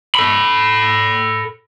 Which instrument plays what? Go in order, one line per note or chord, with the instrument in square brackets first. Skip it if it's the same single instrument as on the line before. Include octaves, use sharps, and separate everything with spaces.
[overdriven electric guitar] A4 B5